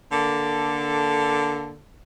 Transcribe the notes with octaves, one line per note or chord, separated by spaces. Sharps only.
D3 A#3 A4